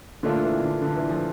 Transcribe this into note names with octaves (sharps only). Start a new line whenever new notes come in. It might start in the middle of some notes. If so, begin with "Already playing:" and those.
A#2 D3 A3 D4 F4
E3
D3
D3
E3
F3